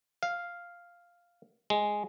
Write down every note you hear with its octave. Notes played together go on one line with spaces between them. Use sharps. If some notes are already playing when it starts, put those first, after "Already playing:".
F5
G#3